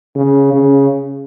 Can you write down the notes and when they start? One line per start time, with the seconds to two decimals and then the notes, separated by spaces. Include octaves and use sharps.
0.15 C#3
0.53 C#3